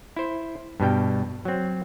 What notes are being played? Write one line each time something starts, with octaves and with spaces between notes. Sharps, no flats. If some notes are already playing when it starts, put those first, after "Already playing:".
E4 C5
G2 B2 G3 G5
F#3 C4